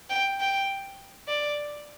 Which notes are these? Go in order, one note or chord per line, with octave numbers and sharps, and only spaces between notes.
G5
G5
D5